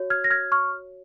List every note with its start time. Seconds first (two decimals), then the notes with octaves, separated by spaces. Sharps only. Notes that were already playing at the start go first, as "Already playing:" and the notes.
Already playing: F#4 C#5
0.10 F6 G#6
0.24 A#6
0.30 F6 G#6
0.52 C#6 F6